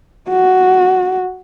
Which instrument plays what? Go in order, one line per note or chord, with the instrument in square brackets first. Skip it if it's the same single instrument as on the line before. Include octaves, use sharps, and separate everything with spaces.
[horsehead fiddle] F#4